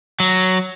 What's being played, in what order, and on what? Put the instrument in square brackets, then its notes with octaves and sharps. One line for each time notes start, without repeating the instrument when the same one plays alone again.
[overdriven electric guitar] F#3